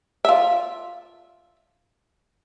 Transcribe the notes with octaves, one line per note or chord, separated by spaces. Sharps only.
F4 E5